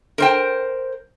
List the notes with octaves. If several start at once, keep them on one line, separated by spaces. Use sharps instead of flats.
A#4 C5 G5